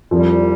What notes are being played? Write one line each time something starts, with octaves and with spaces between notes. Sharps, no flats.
C2 F2 A#2 F3 G3